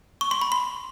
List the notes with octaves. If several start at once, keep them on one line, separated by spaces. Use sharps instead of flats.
C#6
C6
B5
C6